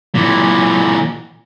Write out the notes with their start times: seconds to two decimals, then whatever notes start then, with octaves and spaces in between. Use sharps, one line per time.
0.15 A#2 E3